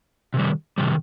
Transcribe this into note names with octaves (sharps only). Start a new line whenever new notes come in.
C3 D#3 G3
C3 D#3 G3